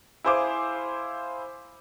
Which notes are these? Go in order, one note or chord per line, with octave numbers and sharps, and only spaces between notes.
E4 G#4 C5 F5 D6